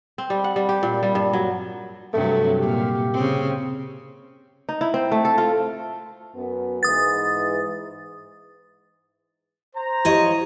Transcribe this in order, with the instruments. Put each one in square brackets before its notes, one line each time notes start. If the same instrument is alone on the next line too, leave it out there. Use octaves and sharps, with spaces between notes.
[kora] C4
G3
F#5
G3
G4
A#2
G3
G2
F#3
[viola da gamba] G2 C3 F#3 [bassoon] A3
[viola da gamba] A#2 [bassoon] G4
[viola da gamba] C#3 C4
[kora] D#4
E4
C4
A3
A4
F4
[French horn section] F#2 B3
[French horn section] G#2 E3 [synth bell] D#6 A6
[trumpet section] C5 A#5
[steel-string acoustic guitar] F3 C#5 D#5 [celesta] E4 G4